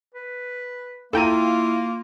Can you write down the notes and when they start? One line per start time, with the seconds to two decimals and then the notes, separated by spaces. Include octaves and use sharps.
0.15 B4
1.13 A#3 E4 F4 A4 G5 A#5 D#7